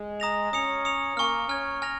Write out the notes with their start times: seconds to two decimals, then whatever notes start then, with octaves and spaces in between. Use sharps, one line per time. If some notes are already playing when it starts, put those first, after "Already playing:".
Already playing: G#3
0.20 A#5 D#6 A#6 F7
0.52 C#4 D#6 C#7 F7
0.85 D#6 C#7 F7
1.16 A#3 G#5 C#6 F6
1.49 C#4 G#5 F6 G#6
1.82 G#5 F6 A#6 F7